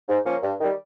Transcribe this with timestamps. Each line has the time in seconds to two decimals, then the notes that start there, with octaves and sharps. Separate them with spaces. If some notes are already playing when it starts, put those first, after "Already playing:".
0.08 G#2
0.26 F3 A#3 C#4
0.43 G2
0.60 D#3 G3